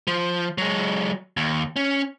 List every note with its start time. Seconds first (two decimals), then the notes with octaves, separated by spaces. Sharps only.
0.07 F3
0.58 F#3 G#3
1.37 D#2
1.76 C#4